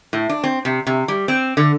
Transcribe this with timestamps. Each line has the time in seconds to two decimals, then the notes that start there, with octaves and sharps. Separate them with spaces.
0.13 A2
0.29 D4
0.44 C4
0.65 C3
0.87 C3
1.08 G3
1.28 C4
1.57 D3